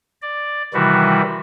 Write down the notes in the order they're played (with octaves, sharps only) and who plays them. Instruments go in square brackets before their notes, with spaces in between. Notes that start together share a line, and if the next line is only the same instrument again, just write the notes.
[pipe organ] D5
C3 D#3 E3 G3 E4 F#4